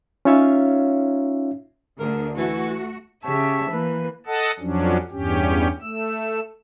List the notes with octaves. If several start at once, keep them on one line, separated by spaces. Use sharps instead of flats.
C#4 D#4 F4 C#5 E5 F5
D2 D3 G#4 A#4
E3 A3 F#4
C#3 G4 C#5 E5 A5
E3 A#3 B4
A4 D#5 F#5 A5
F2 F3 F#3 C#4 D4
E2 G2 C#4 G4
A3 E6